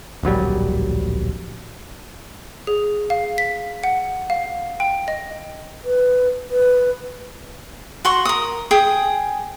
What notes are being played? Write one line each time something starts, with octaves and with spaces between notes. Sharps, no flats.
D1 A#1 F#3 G3
G#4
F5
B6
F#5
F5
G5
D#5
B4
B4
F#4 C6 C#6
A#4 D#6
G#4 G5 D#6